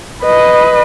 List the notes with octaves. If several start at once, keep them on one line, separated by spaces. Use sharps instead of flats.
B4 D#5